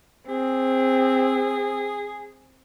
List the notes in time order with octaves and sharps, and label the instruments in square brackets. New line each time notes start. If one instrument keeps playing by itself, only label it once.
[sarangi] C4 [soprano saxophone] G#4